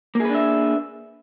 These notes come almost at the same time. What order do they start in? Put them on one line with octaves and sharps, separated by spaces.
A#3 G#4 B4 D4 E5